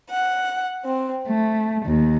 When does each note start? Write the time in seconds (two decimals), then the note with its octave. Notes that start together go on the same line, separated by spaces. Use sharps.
0.10 F#5
0.85 C4
1.27 A3
1.85 D#2